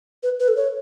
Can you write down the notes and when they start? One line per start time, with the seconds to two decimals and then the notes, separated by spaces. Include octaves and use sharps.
0.23 B4
0.40 B4
0.48 A4
0.56 C#5